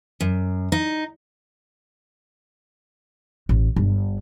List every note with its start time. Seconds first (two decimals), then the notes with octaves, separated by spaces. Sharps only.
0.20 F#2
0.72 D#4
3.49 A1
3.76 G1